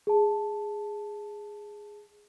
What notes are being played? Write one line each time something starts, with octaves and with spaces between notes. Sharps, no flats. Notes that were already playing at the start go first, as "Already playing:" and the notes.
G#4 A5